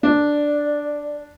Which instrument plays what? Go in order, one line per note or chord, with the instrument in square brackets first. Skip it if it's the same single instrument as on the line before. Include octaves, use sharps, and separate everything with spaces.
[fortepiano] D4 [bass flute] D5